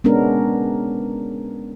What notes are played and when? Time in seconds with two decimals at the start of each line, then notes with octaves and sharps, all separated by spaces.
0.04 G#3 B3 C#4 D4 A#4